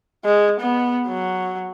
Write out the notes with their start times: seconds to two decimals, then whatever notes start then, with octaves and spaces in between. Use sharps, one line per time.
0.25 G#3
0.61 B3
1.07 F#3